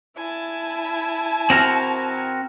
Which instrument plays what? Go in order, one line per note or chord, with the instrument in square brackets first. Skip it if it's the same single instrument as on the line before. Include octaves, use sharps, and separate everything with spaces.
[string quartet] E4 G#5 A5
[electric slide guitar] C4 F#4 A#4